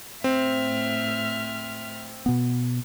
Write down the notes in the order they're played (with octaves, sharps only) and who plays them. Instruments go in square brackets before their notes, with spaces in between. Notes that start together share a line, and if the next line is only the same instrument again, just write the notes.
[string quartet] A2 E5 F6 [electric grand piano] C4
[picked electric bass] B2 B3